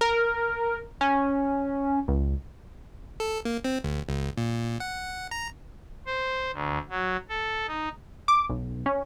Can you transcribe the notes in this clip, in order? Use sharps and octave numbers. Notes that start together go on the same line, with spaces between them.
A#4
C#4
C#2
A4
A#3
C4
D2
C#2
A#2
F#5
A#5
C5
D2
F#3
A4
D#4
D6
B1
C#4